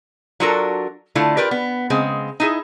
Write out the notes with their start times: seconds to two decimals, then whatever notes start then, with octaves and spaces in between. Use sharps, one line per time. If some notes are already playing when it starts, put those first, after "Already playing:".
0.40 F#3 D4 F4 F#4 A4 A#4
1.15 D3 A3 E4 F4
1.37 F4 G4 A#4 B4 D5
1.51 B3
1.90 C#3 G#3 C4
2.40 D#4 E4 G#4